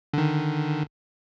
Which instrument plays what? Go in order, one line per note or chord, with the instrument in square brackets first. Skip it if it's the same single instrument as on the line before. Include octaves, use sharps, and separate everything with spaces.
[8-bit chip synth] D3 D#3